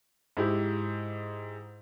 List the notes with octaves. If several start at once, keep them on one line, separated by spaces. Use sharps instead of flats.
G#2 E4 G4